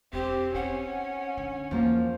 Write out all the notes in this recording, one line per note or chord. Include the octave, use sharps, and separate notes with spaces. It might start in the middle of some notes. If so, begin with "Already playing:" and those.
E1 C4 G4
C#4 D#4 F#5
D3
E2 F3 A#3 F4